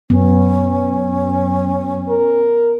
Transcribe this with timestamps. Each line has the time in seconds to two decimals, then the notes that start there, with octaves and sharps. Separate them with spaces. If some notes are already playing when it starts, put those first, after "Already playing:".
0.10 F#2 B3 C#4
2.09 A#4